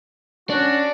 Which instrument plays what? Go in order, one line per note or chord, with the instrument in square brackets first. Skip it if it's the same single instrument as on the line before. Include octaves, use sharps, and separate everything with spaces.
[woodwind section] C#4 F#4 [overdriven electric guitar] D4